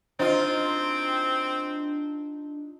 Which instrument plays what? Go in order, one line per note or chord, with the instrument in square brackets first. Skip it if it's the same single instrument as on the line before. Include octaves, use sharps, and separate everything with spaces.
[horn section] F#2 C4 [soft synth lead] D4 [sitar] D#4 F4 [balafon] C5